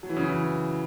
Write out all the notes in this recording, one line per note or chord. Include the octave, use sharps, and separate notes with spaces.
F#3
E3
C#3
E3